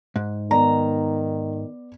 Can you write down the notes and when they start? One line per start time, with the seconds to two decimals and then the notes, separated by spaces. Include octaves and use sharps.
0.16 G#2
0.51 D#3 B3 D5 A#5